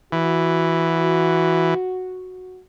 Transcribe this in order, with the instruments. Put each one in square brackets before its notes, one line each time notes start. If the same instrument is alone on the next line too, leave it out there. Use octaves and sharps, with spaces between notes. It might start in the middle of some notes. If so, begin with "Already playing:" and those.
[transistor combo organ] E3 [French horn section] F#4